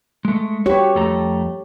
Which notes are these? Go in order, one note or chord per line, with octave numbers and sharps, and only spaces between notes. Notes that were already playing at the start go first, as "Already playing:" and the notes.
G#3 A3
F#4 G4 B4 C#5
F2 A3 A#5